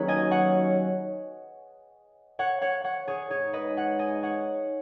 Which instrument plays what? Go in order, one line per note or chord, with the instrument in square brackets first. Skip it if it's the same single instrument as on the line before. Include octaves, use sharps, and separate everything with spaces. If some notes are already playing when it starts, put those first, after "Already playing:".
Already playing: [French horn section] D#2 D#3 F#3 C#4 [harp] G#4 B4 C#5
[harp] D#5 G#5
C#5 F#5
C#5 F#5
C#5 F#5
C#5 F#5
G#4 C#5
[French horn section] G#2 G#3 D#4 [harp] G#4 C#5
[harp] B4 D#5
C#5 F#5
D#5 G#5
C#5 F#5